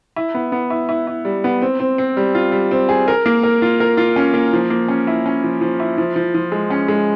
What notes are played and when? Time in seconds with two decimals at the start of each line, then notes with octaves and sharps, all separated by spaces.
0.16 E4
0.34 B3
0.52 B3
0.70 E4
0.89 E4
1.07 E4
1.25 G3
1.44 B3
1.62 C4
1.80 C4
1.98 C4
2.17 G3
2.35 F4
2.52 G3
2.71 C4
2.89 G#4
3.08 A#4
3.26 A#3
3.43 A#4
3.62 F4
3.80 A#4
3.97 F4
4.16 C#4
4.34 A#3
4.53 F3
4.70 A#3
4.88 C#4
5.07 E4
5.26 C#4
5.44 F3
5.61 F3
5.80 E4
5.98 F3
6.16 F3
6.34 F3
6.52 G#3
6.70 C#4
6.88 G#3